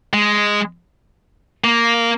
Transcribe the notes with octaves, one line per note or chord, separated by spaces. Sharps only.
G#3
A#3